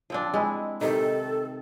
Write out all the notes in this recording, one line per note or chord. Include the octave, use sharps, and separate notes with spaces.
F3 C4 D4
G#3 E4
C3 D#3 A4